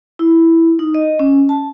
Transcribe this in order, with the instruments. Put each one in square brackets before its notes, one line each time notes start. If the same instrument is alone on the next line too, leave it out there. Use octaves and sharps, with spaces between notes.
[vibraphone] E4
D#4
D#5
C#4
A5